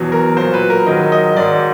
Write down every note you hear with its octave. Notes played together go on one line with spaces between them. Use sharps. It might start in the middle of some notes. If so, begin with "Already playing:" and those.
Already playing: E2 B2 F#3
A#4
A#2 F#3 C5
B4
A#4
G#2 D#3 F#3 D#5
D#5
G#2 D#3 F#3 D5